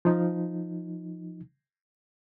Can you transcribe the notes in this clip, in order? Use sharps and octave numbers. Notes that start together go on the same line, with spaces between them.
F3 D#4